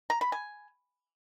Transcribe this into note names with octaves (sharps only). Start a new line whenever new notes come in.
A#5
B5
G#5